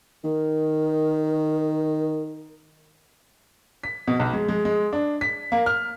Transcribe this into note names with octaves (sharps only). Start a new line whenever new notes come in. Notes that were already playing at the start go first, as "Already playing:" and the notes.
D#3 A#4
B6
B2
B1
G#3
G#3
G#3
D4
B6
A#3
F6